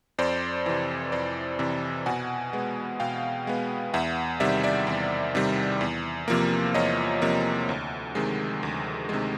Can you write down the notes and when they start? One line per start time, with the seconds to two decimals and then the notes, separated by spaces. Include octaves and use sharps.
0.18 F2 C5 D5
0.66 C3 E3
1.12 F2 C5 D5
1.59 C3 E3
2.06 B2 F#5 G#5
2.53 G#3 B3
3.00 B2 F5 G5
3.47 G#3 B3
3.94 E2 E5 F#5
4.40 C3 D#3 G3 D5 E5
4.63 D5 E5
4.87 E2
5.35 C3 D#3 G3
5.81 E2
6.28 C3 F3 A#3
6.74 E2 C#5 D#5
7.22 C3 F3 A#3
7.69 D2
8.15 C3 D#3 G#3
8.63 D2
9.09 C3 D#3 G#3